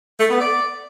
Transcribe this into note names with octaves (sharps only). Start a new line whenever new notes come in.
A3
B3
D5